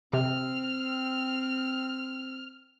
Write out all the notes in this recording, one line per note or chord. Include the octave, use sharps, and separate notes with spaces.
C3 C4 F6